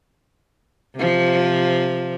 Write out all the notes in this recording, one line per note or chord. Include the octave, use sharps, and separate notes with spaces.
C3 F3